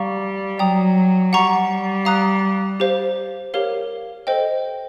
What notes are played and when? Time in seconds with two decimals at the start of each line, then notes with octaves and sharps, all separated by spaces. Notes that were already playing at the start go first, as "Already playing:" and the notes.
Already playing: G3 F5 A#5 C#6
0.58 F#3 D5 G5 A#5 D#6
1.33 G3 F#5 A#5 C#6
2.05 F5 A#5 D#6 F#6
2.80 G4 C5 F5
3.54 G4 A#4 C#5 F5
4.27 A4 C5 D#5 G5